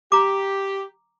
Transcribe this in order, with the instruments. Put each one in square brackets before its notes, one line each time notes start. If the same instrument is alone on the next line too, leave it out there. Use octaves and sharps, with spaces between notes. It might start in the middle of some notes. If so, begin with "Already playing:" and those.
[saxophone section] G4 [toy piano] A#5 D6